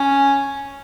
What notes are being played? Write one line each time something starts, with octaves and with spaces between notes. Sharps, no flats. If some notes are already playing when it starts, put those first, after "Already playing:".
Already playing: C#4